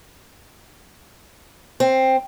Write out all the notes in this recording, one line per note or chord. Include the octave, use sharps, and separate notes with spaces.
C4